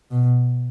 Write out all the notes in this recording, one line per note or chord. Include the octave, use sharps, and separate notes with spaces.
B2